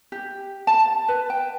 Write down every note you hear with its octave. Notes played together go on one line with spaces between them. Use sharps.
G4
A5
B4
G5